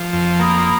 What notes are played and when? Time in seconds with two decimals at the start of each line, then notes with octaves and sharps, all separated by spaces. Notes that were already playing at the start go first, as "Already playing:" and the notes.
Already playing: F3
0.13 F2
0.39 A#3 B5 D#6